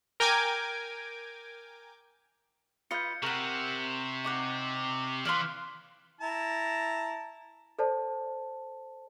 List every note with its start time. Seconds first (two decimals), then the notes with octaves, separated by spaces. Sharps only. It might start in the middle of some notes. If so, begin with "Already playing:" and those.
0.20 A#4 G5 G#5 D6 G#6
2.91 F4 B4 D#5 G6 C#7
3.23 C3 A#4 F#5 C#6 E7 F#7
4.24 D#4 D#5 F#5 C#6 D6
5.25 E3 D5 F5 C6 F6 F#6
6.21 E4 A5 A#5
7.79 A4 C5 D5 A5